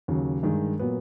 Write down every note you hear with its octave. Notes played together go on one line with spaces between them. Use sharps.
D#2 C#3 F#3
G2 D#3 G#3
A#2 F#3 B3